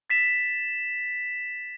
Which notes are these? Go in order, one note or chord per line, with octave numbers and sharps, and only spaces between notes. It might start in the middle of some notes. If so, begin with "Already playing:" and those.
A6 B6 E7